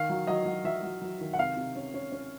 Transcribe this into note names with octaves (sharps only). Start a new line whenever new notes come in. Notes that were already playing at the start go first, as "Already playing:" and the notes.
Already playing: D#3 F5
F#3
F#3 D#5
F#3
F#3 E5
F#3
F#3
D#3
F#5
C3 F5
C3
C#4
C#4
C#4